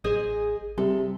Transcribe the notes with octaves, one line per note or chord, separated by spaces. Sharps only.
A1 G#4 C5 D#5
C3 G3 A4